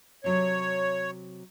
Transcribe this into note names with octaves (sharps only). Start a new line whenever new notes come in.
C3 F#3 A4 C#5